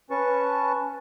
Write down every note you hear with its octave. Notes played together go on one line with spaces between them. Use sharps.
C#4 B4 A5 C#6